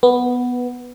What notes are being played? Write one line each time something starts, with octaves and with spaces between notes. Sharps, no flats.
B3